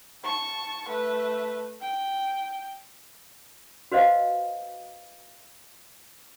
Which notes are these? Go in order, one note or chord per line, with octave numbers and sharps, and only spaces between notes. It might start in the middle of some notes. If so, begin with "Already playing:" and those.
A5 C#6
A3 B4
G5
F#4 B4 C5 D#5 F5